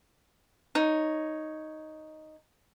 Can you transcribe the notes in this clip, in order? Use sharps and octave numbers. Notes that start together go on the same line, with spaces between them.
D#4 C#5